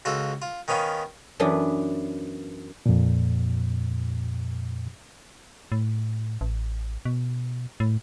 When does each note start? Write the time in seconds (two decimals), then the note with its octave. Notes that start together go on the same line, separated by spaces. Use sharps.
0.05 C#2 F4 F#4 A4
0.42 F4
0.68 D#3 B3 C#4 F5
1.40 F#2 E3 B3 D4
2.86 F2 A#2
5.72 A2
6.41 A1
7.05 B2
7.80 A2